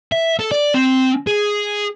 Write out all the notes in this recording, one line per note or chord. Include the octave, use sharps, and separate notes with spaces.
E5
A4
D5
C4
G#4